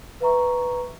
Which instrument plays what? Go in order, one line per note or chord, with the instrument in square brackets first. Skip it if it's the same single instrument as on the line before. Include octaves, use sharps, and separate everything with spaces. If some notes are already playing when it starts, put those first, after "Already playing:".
[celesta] B4 E5 A#5 C#6